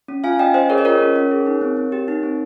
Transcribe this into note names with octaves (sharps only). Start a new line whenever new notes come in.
C#4
F4 F5 G#5
C#4 D#5 G5
C#4 C5 D#5
G#4 A#4 C#5
D#5
F4 A#4 C#5
C#4
C#4
G#4
D#4
C4
C4
G4
D#4
C4